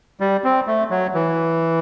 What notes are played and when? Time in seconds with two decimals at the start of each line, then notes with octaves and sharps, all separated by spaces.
0.20 G3
0.44 C4
0.67 A3
0.91 F#3
1.15 E3